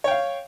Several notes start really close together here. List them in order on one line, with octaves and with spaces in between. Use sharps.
C#5 G5 F5